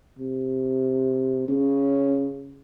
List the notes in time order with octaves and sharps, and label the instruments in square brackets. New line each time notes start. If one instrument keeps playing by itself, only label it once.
[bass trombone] C3
[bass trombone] C#3 [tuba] C#4